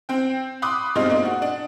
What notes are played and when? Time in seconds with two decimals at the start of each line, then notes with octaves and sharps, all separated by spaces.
0.09 C4 G5
0.62 B5 C6 D6 D#6 F#6
0.95 G2 B2 G#3 C4 D#4 F4
1.09 G#3 A#3 C4 D4 D#4
1.25 F#4
1.42 D4